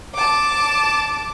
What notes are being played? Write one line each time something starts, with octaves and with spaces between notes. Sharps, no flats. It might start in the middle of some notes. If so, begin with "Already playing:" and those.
A5 D6